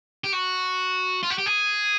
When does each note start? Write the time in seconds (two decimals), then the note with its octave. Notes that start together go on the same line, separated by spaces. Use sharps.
0.24 G4
0.33 F#4
1.23 F4
1.30 F#4
1.38 G4
1.46 G#4